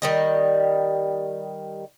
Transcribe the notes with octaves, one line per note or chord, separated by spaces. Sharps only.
D#3 G3 D#5